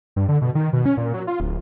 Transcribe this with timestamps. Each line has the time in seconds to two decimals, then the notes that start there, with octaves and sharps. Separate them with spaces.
0.16 G2
0.28 D3
0.42 B2
0.55 D#3
0.73 B2
0.86 C#4
0.97 A#2
1.14 F#3
1.27 F4
1.40 D1